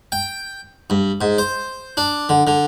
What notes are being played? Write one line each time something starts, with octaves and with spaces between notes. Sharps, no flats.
G5
G2
G#2
C5
D4
D3
D3